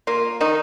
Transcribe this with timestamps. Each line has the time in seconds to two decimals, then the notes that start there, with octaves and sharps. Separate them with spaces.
0.07 A#3 F4
0.41 D#3 D#4